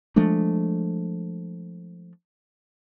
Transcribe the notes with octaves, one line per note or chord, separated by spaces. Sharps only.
F3 G#3 A3 D4